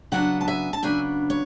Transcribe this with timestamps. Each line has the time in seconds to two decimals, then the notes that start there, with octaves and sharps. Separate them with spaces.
0.12 C#3 F#3 B3 D4 F#5 A5
0.41 A5
0.48 E5 G#5
0.73 A5
0.83 C#3 F#3 B3 D4 E5 G#5
1.30 C#5